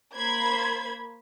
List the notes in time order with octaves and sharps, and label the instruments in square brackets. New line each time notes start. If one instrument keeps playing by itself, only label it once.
[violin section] A#3 C5 B5 G#6